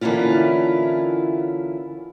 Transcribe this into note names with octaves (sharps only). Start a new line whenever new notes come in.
D3 E3 A#3 C#4 E4 F4